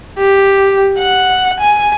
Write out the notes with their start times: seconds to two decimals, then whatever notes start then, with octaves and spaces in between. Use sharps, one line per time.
0.18 G4
0.98 F#5
1.60 G#5